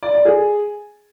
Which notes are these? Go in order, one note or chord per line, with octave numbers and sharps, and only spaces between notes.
D5
D5
G#4